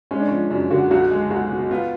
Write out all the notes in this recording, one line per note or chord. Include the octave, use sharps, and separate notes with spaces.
G#3 C#4
D4
F3 C#4
F#2 D4
D3 F#4
B1 F#4
G#3
B1 F#4
B2
B3 F4